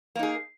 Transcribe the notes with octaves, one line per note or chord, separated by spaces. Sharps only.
A#3 D#4 G#4